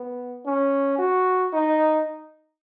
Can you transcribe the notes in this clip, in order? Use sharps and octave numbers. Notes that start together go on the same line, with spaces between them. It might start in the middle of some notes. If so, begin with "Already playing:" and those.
Already playing: B3
C#4
F#4
D#4